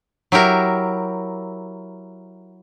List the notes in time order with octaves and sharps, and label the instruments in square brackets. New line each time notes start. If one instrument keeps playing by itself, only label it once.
[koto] F#3 E4 G4 A#4 E5